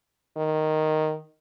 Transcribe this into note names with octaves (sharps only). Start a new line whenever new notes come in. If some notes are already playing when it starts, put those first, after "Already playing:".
D#3